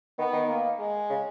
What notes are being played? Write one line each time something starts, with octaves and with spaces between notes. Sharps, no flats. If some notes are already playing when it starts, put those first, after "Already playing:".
D#3 B3
D#3
A#3
G#3
C#3